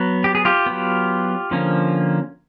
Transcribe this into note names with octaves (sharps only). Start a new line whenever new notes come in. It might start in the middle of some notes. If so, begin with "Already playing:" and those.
Already playing: F#3 B3
G4
G#4
F4 G4
F#3 B3
D3 F3 A#3 C#4